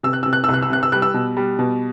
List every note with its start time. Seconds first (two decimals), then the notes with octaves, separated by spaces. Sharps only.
0.03 C3 E6
0.13 F#6
0.23 C3 E6
0.33 F#6
0.44 E6
0.49 C2 F#6
0.62 E6
0.70 C3 F#6
0.83 E6
0.92 G3 F#6
1.02 E6
1.14 B2
1.37 G3
1.59 B2